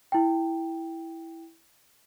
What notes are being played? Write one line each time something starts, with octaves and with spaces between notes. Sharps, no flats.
E4 G5